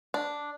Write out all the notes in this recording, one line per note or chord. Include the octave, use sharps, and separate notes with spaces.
D4